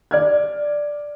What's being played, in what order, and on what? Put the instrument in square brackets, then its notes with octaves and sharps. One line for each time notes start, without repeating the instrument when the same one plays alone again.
[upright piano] D5 F6 G#6